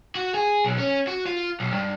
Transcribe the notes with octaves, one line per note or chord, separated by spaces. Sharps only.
F#4
G#4
B1
C#4
F#4
F4
B1
G2